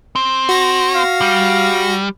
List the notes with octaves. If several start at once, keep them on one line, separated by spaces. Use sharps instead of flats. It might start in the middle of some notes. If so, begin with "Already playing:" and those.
C4
F#4 A#6
F5
G3